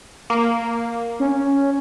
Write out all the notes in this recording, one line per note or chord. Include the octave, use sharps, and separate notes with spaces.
A#3
C#4